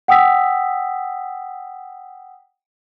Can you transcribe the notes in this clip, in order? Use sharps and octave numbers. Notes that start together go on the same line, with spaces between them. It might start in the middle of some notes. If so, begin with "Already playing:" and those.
F#5 G5 D#6 E6 B6